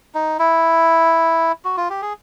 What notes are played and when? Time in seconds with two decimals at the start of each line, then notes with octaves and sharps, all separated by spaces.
0.15 D#4
0.39 E4
1.65 F#4
1.77 F4
1.90 G4
2.02 G#4